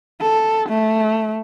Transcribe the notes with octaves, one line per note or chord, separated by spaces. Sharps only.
A4
A3